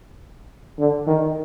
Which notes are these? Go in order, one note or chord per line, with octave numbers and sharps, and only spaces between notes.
D3
D#3